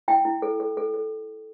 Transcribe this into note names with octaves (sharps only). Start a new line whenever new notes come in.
E4 G5
E4
A4
A4
A4
A4